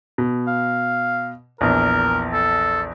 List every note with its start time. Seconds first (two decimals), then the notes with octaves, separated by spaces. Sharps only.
0.18 B2
0.47 F5
1.61 A#1 E2 A#4
2.33 A4